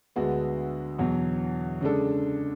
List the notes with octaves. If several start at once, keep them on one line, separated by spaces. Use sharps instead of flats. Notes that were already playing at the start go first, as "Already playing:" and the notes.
D2 D3 G#3 B3 F#4
E2 B2 F#3
C#3 G#3 D4 A4